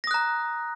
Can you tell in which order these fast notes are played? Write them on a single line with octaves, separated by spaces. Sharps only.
A#6 D#6 F#6 A#5